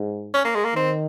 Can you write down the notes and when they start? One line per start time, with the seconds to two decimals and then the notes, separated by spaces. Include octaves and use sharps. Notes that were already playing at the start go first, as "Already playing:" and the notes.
Already playing: G#2
0.34 C#4
0.45 A#3
0.55 G#3
0.64 A#3
0.75 D#3 C4